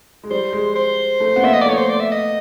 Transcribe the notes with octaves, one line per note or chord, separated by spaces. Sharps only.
G#3
G3 C5
G#3
C5
A3
B3
A#3 E5
D#5
D5
A3 C#5
C5
D5
E5
D#5